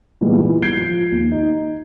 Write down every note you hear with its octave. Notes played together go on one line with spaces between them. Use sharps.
A#2 E3 G3 G#3 B3
E3
G6 G#6 C7 D7 G7
F3
D#2
D#4